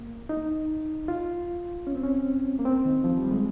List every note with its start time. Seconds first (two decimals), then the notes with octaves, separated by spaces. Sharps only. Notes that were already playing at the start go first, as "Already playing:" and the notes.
Already playing: A#3
0.29 D#4
1.08 F4
1.87 C#4
1.95 C4
2.03 C#4
2.59 A#3
2.65 C4
2.85 D#3
3.04 F3
3.18 G3
3.31 G#3